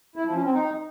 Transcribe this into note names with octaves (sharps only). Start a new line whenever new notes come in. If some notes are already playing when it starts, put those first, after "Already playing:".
E4
F3
C#4
C4
D#4